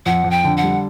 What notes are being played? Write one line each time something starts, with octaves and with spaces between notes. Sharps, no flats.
F2 F#5
F2
G5
D3
F#5
G3